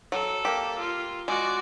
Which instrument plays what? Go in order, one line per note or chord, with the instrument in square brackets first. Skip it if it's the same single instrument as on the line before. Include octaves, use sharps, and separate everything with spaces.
[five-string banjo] F#3 [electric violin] A4
[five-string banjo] A#3 G4
[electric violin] F4
[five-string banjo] G#3 [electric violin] F#4 D5